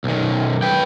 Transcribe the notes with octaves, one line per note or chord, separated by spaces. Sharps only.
B1 D#3
B4 G5